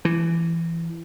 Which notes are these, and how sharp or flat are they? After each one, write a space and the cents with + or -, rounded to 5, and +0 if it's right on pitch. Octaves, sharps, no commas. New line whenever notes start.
E3 +20